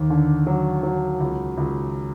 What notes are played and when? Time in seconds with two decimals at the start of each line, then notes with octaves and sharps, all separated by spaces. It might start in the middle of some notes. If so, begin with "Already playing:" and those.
Already playing: D#2
0.10 D3
0.47 F#3
0.83 F#3
1.20 C#2
1.57 C#2